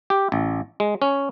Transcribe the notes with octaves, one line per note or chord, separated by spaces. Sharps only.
G4
A1
G#3
C#4